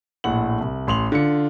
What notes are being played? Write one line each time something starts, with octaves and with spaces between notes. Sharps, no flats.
A#1 A2 F#5 F#7
C2
A1 C6 F7 F#7
D3 F4 C#7